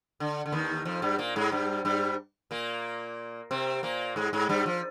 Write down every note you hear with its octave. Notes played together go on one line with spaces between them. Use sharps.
D3
D3
D#2 D#3
F2 F3
G2 G3
A#2 A#3
G#2 G#3
G2 G3
G2 G3
A#2 A#3
C3 C4
A#2 A#3
G#2 G#3
G#2 G#3
G2 G3
F3